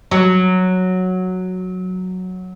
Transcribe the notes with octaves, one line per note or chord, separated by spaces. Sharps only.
F#3